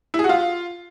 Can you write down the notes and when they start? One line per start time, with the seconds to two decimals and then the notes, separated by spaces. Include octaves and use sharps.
0.14 E4
0.19 G#4
0.24 F#4
0.29 F4